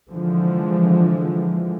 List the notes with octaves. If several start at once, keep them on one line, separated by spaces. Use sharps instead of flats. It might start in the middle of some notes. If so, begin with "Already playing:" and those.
D3 E3 F3 G#3